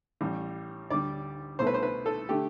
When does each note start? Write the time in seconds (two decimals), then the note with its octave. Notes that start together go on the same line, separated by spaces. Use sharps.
0.21 A1 A2 G3
0.90 D2 D3 G3 D5
1.59 C2 B2 A3 C5
1.67 B4
1.74 C5
1.83 B4
2.06 A4
2.29 D3 A3 G4